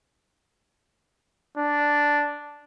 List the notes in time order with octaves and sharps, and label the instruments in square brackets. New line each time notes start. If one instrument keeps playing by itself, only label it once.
[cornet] D4